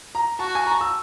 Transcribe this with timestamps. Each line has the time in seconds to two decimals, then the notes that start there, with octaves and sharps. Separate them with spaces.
0.15 A#5
0.39 F#4 A5
0.55 G#5
0.66 A#5
0.72 A5
0.81 E6